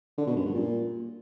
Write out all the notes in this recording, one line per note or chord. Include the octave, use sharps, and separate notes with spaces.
D3
B2
F#2
G2
A#2